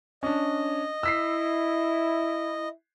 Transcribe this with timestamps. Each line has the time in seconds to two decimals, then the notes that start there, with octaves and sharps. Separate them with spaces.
0.23 C#4 D4 D#5
1.03 E4 E6 B6 C7